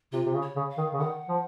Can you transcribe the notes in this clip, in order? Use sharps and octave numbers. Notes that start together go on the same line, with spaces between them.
C3 F4
C3
C#3
C#5
C#3
F5
D#3
C#3
D#3 F#5
F3